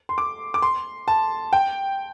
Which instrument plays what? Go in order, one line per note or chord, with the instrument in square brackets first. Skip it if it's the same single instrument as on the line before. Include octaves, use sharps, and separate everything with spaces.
[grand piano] C6
D6
D6
C6
A5
G5